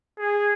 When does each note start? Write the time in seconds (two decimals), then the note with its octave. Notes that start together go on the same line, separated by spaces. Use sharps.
0.19 G#4